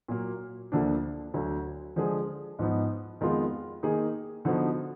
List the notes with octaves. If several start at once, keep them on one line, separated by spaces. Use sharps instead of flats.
A#2 F#3 A#3
D2 D3 F3 A#3 D4
D2 D3 F#3
D3 F3 G#3 D4 G#4
G#2 F3 B3 D#4
F2 D#3 G#3 B3 F4
D#3 A#3 D#4 G#4
D3 F3 B3 D#4 F#4